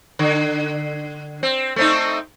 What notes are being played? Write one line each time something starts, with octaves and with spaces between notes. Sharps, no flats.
D3
C4
A3 C4 D#4